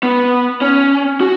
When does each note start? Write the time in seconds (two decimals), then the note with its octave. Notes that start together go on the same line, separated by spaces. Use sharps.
0.03 B3
0.61 C#4
1.21 F#4